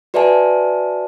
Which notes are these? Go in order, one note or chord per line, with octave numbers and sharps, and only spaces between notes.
F#4 B4 D5 E5 G#5 A5